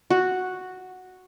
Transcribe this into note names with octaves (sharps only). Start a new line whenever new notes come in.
F#4